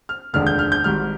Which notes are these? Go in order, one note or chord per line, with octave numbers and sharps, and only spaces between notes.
F6
F1 D#2 D3 G#3 D4 F6
G6
F6
G6
G#1 G#2 G3 F6